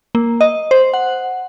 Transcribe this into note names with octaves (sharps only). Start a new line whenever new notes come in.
A#3
D#5
C5
F#5